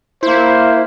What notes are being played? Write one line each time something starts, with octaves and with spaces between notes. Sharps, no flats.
A#3 E4 C5